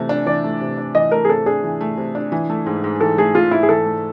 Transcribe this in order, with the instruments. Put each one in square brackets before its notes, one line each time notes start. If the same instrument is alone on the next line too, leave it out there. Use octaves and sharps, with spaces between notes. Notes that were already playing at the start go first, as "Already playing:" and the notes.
Already playing: [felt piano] C3 E3 A3
D4
[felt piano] E3 [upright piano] D5
[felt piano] A3
C3
D4
[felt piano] E3 [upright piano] D#5
[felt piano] A3 [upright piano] A#4
[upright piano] G#4
[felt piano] C3 [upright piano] A4
[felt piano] D4 [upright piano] G#4
[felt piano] E3
A3
C3
D4
E3
A3
G#2
G#2
[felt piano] E3 [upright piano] A4
[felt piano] A3 [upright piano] G#4
[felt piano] G#2 [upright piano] F4
[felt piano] G#2 [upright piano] E4
[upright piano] G#4
[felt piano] E3 [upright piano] A4
[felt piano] A3